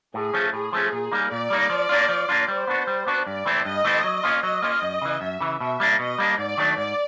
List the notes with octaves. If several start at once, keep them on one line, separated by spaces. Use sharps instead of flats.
A2 G#4
F3 A3 C#4
A2 G#4
F3 A3 C#4
A#2
G3 A#3 D#4
A#2 D5
G3 A#3 D#4
F3
A#3 D4 F4
F3
A#3 D4 F4
G3 C5
B3 D4 F#4
G3
B3 D4 F#4
G2 D5
E3 A3 C4 E4
G2 D#5
E3 A3 C4 E4
F#3
A#3 C#4 F4
F#3 D#5
A#3 C#4 F4
F#2
C#3 E3
F#2 E5
C#3 E3
B2 E5
G3 A#3 D4
B2 D#5
G3 A#3 D4
G#2 D5
D#3 F#3 A3 D4
G#2 D5